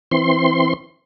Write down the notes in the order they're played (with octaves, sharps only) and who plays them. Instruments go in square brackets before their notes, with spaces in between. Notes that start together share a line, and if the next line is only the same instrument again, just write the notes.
[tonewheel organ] E3 C4 C6